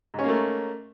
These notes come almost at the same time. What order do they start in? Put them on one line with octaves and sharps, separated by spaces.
G#2 C#4 A#3 A3